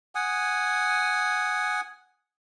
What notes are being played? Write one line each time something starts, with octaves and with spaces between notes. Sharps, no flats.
F#5 G#5 D#6